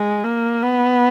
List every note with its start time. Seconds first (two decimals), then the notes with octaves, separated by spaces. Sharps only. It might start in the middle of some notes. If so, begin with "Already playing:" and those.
Already playing: G#3
0.24 A#3
0.63 B3